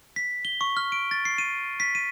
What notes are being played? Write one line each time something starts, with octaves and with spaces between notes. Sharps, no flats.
B6
G7
C#6
F6
D7
A6
C7
D#7
B6
D#7